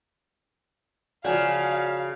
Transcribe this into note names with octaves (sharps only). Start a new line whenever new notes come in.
C#3 F3 F#3 F#4 D5 F5 G#5